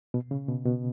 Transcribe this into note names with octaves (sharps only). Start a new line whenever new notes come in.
B2
C#3
B2
B2